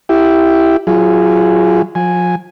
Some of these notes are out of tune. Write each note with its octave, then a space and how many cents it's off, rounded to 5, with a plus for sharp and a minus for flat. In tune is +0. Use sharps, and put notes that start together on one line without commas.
E4 +0 G4 +0
F#3 -10 F4 -35 G#4 +0
F3 +35 G#5 +0